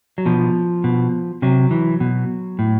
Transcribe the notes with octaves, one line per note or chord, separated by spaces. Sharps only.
F#3
B2 F3
B2
C3 F#3
E3
B2
A2